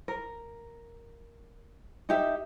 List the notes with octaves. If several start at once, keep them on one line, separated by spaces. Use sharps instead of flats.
A#4
D#4 G4 E5